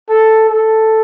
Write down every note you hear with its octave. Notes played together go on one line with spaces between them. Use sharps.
A4
A4